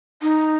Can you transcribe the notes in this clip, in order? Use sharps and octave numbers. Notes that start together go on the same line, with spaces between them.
D#4